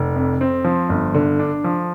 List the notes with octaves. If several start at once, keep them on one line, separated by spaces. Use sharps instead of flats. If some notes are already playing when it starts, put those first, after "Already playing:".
Already playing: F1
F2
C4
F3
G1
D3
D4
F3